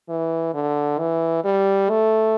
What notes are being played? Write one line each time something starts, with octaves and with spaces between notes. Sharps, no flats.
E3
D3
E3
G3
A3